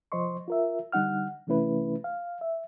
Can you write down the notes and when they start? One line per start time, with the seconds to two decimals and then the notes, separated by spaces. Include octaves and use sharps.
0.12 C2 F3 C5 D#5 C6 C#6
0.48 F4 A#4 E5
0.92 D3 G3 D#4 F#5 F6
1.47 C3 E3 A3 C#4 E4 B4
2.04 F5
2.41 E5